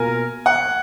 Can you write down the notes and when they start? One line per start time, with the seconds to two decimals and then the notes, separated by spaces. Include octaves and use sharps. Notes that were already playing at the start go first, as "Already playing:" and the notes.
Already playing: B2 A#3 F4 A#4 G#5
0.46 F#5